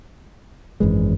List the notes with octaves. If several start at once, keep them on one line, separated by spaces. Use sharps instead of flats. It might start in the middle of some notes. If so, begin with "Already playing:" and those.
G#1 F#2 E3 G#3